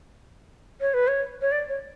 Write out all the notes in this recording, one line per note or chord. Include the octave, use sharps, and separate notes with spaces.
C#5
B4
C#5
C#5
D5
C#5